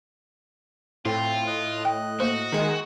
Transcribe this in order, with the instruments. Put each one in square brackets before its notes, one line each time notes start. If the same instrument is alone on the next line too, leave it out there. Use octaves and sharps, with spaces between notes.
[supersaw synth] A2 [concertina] C4 C5 [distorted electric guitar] F4
[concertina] D#5 F#6
[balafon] G5
[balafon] A#3 C5 [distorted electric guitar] F#4
[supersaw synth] D#3 G#3